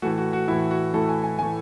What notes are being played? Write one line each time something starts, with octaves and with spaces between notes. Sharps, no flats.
A2 E3 A3 F#4
F#4
F#4
A2 E3 A3 E4
F#4
A2 E3 A3 A4
G#5
G#5
A2 E3 A3 G#5